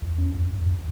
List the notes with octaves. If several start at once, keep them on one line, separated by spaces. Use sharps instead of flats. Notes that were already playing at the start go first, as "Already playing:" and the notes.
E2
C#4
F2
F#2
D#2